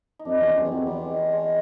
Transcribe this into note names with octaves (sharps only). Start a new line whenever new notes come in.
D#4
F2 D4
E2 C#4
F#2 C4
E2
F2 F#3
E2 G3
G#3
A3
G#3